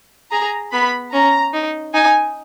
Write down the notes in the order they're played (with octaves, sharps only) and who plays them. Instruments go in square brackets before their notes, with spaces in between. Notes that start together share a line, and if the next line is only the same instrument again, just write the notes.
[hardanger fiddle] G#4 [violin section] A#5
[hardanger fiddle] B3 [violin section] B5
[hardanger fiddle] C#4 [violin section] A#5
[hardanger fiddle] D#4
[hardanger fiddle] D#4 [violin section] G#5